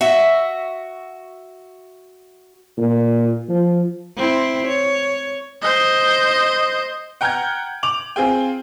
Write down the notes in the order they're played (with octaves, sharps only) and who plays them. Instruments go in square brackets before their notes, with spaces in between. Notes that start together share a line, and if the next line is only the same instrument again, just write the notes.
[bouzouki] F#4 E5
[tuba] A#2
F3
[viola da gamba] C4 E4
C#5
[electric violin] C5 D#5
[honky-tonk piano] F#5 G5 A#5 F6 G6 G#6
D6 F7 F#7
C4 F4 G#4 G5